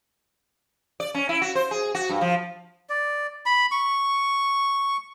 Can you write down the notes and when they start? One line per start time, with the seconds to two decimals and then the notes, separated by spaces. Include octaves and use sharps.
1.00 D5
1.15 C#4
1.29 E4
1.42 F#4
1.55 C5
1.71 G#4
1.95 F#4
2.09 G2
2.21 F3
2.90 D5
3.46 B5
3.71 C#6